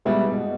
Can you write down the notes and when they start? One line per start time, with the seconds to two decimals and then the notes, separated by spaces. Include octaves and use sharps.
0.05 B2 G3 G#3 B3 E4
0.32 B2